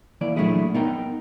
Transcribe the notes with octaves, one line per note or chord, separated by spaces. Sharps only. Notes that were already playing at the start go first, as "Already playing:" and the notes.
E3 A#3 D5
A#2 F#3 A3 D4 E4 G#4
B3 D#4 A#4 G5